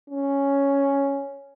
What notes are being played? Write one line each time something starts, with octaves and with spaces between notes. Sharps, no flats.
C#4